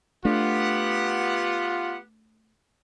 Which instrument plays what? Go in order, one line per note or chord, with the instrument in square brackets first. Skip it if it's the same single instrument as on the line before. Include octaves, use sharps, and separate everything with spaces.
[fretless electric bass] A3 D4 [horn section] B3 G4 F#5 [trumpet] F4